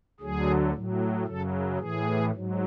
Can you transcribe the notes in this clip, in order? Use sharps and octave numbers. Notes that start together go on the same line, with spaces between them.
D2 D3 F#3 G#4
A2 F#3
F#2 C#3 F#3 A4
A2 E3 G#4
G#2 F#3